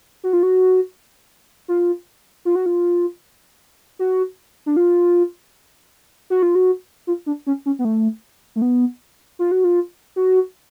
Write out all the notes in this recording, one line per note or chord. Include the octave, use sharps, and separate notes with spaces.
F#4
F4
F#4
F4
F4
F#4
F4
F#4
D4
F4
F#4
F4
F#4
F4
D4
C#4
C#4
B3
A3
A3
B3
F4
F#4
F4
F#4